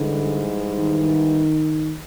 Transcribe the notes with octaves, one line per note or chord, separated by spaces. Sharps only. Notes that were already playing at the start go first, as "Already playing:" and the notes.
Already playing: G#2 D3 E3 G3
D#3